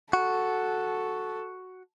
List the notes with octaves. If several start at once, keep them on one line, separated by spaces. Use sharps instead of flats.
F#4 A4